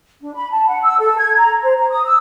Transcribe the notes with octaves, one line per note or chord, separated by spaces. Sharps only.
D4
B5
A5
F#5
E6
A4
G#6
A#5
C5
A#5
D#6
E6